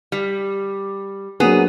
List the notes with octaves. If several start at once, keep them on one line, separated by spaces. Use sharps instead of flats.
G3
F#3 A#3 B3 D4 G#4